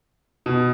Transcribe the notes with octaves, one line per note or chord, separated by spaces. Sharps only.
B2